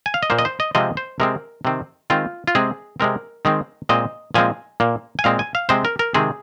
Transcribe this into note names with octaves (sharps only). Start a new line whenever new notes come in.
G#5
F5
D#5
A#2 A#3 C5
D#5
C5
D#5
C3 F3 G#3 C4 D#5
C5
C3 G#3 C4 A#4
C3 D#3 C4
D#3 G#3 C4 F4
F4
C3 G#3 C4 G#4
C3 G#3 C4 A#4
D#3 G#3 C4
A#2 G#3 C4 D#5
A#2 F3 G#3 C4 G#5
A#2 A#3
G#5
A#2 G#3 C4 F5
G#5
F5
C3 G#3 C4 C5
A#4
A#4
C3 D#3 G#3 C4 G#4